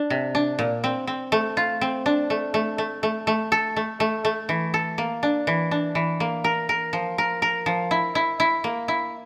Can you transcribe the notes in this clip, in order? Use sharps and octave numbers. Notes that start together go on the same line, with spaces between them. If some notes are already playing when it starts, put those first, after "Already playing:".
Already playing: D4
C3
D4
A#2
C4
C4
A3
F4
C4
D4
A3
A3
A3
A3
A3
A4
A3
A3
A3
E3
A4
A#3
D4
E3
D4
E3
A#3
A#4
A#4
F3
A#4
A#4
F3
E4
E4
E4
A#3
E4